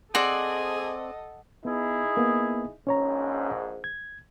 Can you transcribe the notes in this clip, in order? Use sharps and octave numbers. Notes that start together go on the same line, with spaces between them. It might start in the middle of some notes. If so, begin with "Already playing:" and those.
C4 G#4 A4 D5 D#5 F#5
B3 D#4 E4 G#4
A#3 B3
A#1 G#2 C#4 C#5 A#5
G#6